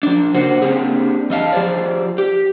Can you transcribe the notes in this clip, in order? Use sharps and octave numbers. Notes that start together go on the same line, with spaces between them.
F3 D4
C#3 A#3 F#4 C5
A#3 C4 D4 G4 G#4
E2 D#5 F5 A5
F3 F4 G4 G#4 C5 D5
G4